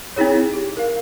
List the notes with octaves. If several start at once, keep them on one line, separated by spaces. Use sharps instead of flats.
C4 D#4 E4 G#4 C#5
G4
A#4 F5